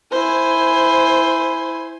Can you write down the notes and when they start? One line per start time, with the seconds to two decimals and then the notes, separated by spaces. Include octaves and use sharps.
0.12 E4 C5 G#5